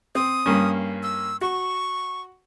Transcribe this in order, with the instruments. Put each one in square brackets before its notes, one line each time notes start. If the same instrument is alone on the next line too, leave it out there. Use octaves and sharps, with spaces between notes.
[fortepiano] C4 [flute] D#6
[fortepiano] G2 A#3 C#4
[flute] E6
[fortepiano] F#4 [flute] C#6